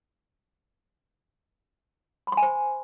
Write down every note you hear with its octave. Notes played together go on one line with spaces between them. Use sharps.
B5
C6
G#5
C5